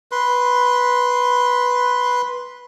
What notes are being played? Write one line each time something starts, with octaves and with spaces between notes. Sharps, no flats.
B4 C6